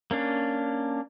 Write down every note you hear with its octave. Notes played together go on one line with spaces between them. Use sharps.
A#3 C#4 D4